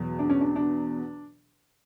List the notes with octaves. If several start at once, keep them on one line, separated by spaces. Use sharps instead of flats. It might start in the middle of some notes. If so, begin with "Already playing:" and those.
Already playing: E2 B2 F#3
D4
C#4
D4
D4